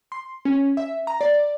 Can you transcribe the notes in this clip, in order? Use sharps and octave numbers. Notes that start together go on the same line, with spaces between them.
C6
C#4
E5
A#5
D5